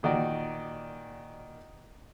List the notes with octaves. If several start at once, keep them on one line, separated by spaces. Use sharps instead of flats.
A#2 D#3 F#4 D5